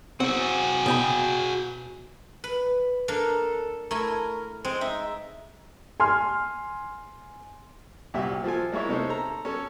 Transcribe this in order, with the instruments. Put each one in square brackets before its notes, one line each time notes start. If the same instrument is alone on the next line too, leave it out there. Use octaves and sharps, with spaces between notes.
[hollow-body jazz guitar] C4 [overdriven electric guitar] F#4 G#4
[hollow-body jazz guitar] B2 G5 B5
[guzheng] B4
[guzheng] A#3 D4 A#4 [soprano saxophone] A4
[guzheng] A3 E4 G#5 [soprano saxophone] A#4
[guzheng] G#3 [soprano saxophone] C4
[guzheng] D#4 [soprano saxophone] E5
[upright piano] G#5 C6 F6
[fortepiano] C2 A#2 F#4 G4 E5
F3 F4 A4 G#5
G#3 A#3 E4 C#5 E5
C3 C#4 D#4 A4 C5
A4 A#5
C#4 A4